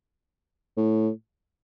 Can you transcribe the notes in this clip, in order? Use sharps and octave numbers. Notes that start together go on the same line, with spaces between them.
A2